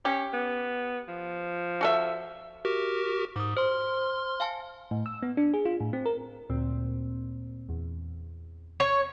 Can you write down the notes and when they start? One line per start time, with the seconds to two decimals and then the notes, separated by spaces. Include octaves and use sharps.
0.05 C#4 G4
0.33 B3
1.08 F3
1.81 F#4 A4 E5
2.65 F#4 G4 A#4
3.36 G#2 D6 D#6
3.57 C5 C6 F6
4.40 F5 G#5 A5
4.91 A2
5.06 E6
5.23 B3
5.37 D4
5.54 G#4
5.65 F4
5.80 A2
5.93 C4
6.06 A#4
6.50 D2 A#2 C4
7.69 E2
8.80 C#5